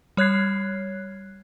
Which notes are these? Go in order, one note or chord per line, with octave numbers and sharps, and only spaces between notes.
G3 C#5 F#6 G#6 C7